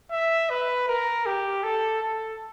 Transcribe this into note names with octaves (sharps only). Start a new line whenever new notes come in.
E5
B4
A#4
G4
A4
A4